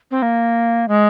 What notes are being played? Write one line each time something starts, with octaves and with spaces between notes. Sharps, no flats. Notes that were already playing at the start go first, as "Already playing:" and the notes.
C4
A#3
G#3